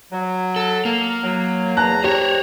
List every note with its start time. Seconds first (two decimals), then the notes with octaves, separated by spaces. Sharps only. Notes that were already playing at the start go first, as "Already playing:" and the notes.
0.12 F#3
0.56 A4
0.85 A#3
1.23 F#3
1.77 E2 A5 A#5 F#6
2.04 G4 C5 C#5